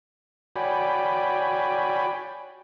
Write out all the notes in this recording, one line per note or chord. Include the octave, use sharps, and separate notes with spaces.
F#4 C#5 D5 G5 G#5 B5